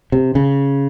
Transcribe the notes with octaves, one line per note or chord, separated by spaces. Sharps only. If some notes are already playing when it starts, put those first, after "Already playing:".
C3
C#3